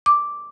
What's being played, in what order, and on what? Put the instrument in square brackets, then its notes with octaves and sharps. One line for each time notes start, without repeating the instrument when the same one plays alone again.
[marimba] D6